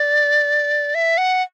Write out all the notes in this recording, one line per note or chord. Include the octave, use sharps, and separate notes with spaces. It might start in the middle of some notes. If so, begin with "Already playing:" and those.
Already playing: D5
E5
F#5